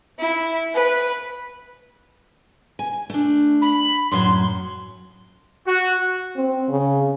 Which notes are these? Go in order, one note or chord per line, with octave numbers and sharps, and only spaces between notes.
E4
B4
G#5
A3 D4
B5
F#2 A2 F#3 C6
F#4
C4
C#3